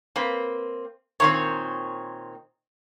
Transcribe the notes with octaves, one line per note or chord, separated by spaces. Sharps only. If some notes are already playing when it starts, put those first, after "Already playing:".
A#3 C4 B4
A#2 D#3 C4 C#5